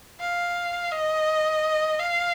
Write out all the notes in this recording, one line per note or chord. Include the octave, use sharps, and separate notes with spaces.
F5
D#5
F5